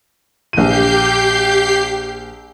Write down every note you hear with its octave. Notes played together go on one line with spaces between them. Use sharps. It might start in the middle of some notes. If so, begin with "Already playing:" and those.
A#1 G4 G6 C7 D#7